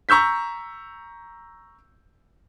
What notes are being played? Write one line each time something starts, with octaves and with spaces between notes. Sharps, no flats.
A#5 C#6 E6 G6 B6